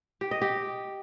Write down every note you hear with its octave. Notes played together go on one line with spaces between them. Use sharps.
G4
D#5
G4